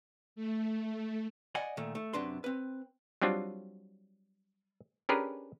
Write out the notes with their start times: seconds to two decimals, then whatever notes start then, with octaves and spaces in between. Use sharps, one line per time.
0.36 A3
1.55 D5 D#5 F#5 G#5
1.77 A#2 D#3 A3
1.95 A3
2.13 F#2 C3 D4 B4 C6
2.44 C4 B4
3.22 F#3 G3 C4 D4 F4
5.09 C#4 D4 G4 G#4 A#4 B4